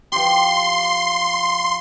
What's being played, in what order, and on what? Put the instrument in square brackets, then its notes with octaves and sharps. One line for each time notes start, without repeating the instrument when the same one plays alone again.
[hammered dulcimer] F3 G4 [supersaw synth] C6